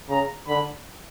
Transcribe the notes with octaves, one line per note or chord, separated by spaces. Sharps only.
C#3 A#5
D3 B5